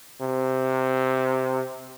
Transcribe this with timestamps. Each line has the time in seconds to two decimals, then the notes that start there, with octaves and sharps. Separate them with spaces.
0.21 C3